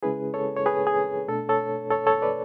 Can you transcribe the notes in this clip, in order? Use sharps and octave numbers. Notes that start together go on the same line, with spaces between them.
C#3 G#3 C#4 E4 G#4 B4
A4 C#5
C#5
G#4 B4
G#4
B2 A3 D4 A4
A4 C#5
A4 C#5
A4 C#5
B4 D5